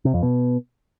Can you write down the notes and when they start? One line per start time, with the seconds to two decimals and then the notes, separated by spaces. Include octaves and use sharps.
0.05 C3
0.14 F2
0.23 B2